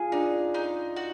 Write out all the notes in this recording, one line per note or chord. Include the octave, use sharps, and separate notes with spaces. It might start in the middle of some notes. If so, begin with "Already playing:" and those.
Already playing: F4 G#4
D4 D#4
D#4
F#4